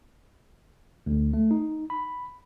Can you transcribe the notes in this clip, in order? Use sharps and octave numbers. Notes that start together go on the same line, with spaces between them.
D2
A3
D#4
B5